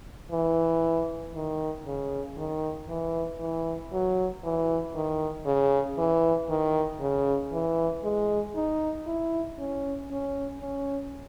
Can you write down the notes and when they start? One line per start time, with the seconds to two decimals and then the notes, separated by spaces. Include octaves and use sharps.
0.32 E3
1.35 D#3
1.86 C#3
2.37 D#3
2.89 E3
3.40 E3
3.92 F#3
4.44 E3
4.95 D#3
5.46 C#3
5.98 E3
6.50 D#3
7.01 C#3
7.52 E3
8.04 G#3
8.56 D#4
9.07 E4
9.59 C#4
10.10 C#4
10.61 C#4